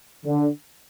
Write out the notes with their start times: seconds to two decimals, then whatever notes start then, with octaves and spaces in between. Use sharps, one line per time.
0.24 D3